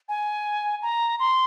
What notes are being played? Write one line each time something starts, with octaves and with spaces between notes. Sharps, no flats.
G#5
A#5
C6